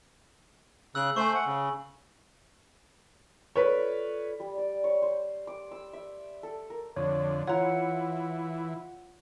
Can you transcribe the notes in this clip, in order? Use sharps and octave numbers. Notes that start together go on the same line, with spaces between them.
C#3 E6 F#6 F#7
A3 C5 G#5 C#6
F#5
C#3
F4 A4 B4 C#5 D5
G3
D5
C#5
C5
D6
E6
E5
A4
A#4
F2 D3 C#5
E3 F4 C#5 F#5 A#5